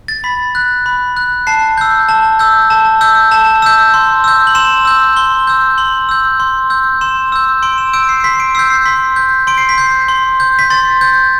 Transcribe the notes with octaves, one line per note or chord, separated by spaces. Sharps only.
A6
B5 B6
F#6
B5
F#6
A5 C7
E6 G6
A5
E6 G6
A5
E6 G6
A5 E7
E6 G6
C6
E6 G6
F#7
C6 E7
E6 G6
C6 G7
E6 G6
C6 F#7
E6 G6
C6
E6 G6
C6 E7
E6 G6
C6 D7
E7
E6 G6 D7
C7
C7
C6 B6
C7
D7
E6 G6 C7
C7
C6 B6
G6
C6 D7
C7
B6
G6 C7
C6
G6
B6
C6 A6
G6